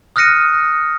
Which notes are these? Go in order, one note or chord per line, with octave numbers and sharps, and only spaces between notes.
D#6 F6 F#6 A#6 C#7 D#7